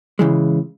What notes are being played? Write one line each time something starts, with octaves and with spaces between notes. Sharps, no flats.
C#3 E3 G#3